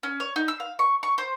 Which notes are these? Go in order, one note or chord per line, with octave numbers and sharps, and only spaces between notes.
C#4
C#5
D#4
E6
F5
C#6
C#6
C5